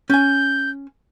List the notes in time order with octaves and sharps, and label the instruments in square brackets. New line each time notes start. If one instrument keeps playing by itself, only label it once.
[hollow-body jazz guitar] C#4 G#5 [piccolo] G6